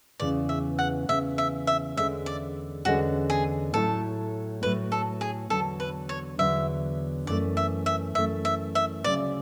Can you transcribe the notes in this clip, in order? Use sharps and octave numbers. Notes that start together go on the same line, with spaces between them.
E2 C#3 E3 D5
E5
F#5
E2 C#3 E3 E5
E5
E5
E2 D3 G#3 C#4 E5
D5
E2 D3 G#3 C#4 F#4
G#4
A2 F#3 A3 E4 A4
A2 F#3 A3 E4 B4
A4
G#4
E2 D3 F#3 A4
B4
C#5
E2 D3 F#3 E5
F#2 E3 A3 D5
E5
E5
F#2 E3 A3 E5
E5
E5
D2 C#3 F#3 D5